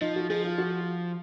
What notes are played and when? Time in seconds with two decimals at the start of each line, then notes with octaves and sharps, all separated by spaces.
0.01 F3 D#4
0.16 F#4
0.30 F3 G#4
0.44 F4
0.58 F#4